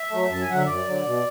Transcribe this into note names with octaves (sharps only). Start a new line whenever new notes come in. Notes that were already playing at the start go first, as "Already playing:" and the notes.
Already playing: E5
F#3 A3
F#2 A5
G#5
D3 F#3 F#5
E5
F#2 D5
D3 F#3
B2